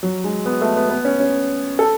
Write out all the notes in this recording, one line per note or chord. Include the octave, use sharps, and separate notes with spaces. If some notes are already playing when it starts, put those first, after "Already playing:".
F#3
G#3
B3
A3
B3
B3
C#4
C#4
A4